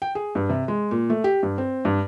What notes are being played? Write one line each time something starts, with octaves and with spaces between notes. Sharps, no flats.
G5
G#4
G2
C3
G#3
A#2
A3
G4
G2
C4
G2